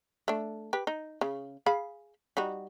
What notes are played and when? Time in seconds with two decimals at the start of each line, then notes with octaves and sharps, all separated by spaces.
0.28 A3 D4
0.73 G4 B4
0.87 D#4
1.21 C#3
1.66 G#4 F5 B5
2.37 G3 D#4 F#4